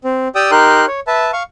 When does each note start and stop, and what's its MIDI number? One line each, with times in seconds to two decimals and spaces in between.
0.04 0.28 60
0.35 0.51 67
0.35 0.51 74
0.35 0.51 79
0.35 0.51 87
0.35 0.51 88
0.51 0.86 63
0.51 0.86 67
0.51 0.86 70
0.51 0.86 84
0.51 0.86 90
0.87 1.00 73
1.07 1.31 71
1.07 1.31 76
1.07 1.31 81
1.33 1.43 77
1.33 1.43 85